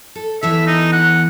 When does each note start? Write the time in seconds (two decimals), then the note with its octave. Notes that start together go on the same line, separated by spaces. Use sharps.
0.15 A4
0.43 E2 E3 A4 E5
0.67 D#4
0.92 F#5